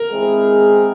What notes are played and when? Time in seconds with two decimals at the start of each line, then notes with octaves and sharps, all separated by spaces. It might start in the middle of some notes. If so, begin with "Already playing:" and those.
Already playing: A#4
0.11 G#3 C4 E4 G#4